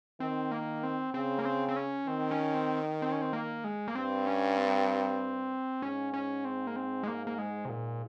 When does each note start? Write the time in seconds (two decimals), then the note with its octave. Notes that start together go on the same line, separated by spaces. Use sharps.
0.20 D#3 C4
0.51 A#3
0.83 C4
1.14 C#3 C4
1.39 A#3
1.45 C4
1.69 C4
1.76 C#4
2.07 D#3 C4
2.31 C#4
2.54 C4
3.02 C4
3.12 C#4
3.22 C4
3.33 A#3
3.64 G#3
3.88 A#3
3.95 G2 C4
4.26 C#4
4.58 C4
5.82 G#2 C#4
6.14 C#4
6.45 C4
6.67 A#3
6.76 C4
7.03 G#3
7.08 A#3
7.27 A#3
7.38 G#3
7.65 C3
7.69 A#2